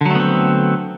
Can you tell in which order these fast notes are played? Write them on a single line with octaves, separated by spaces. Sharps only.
D3 F#3 A3 B3 C4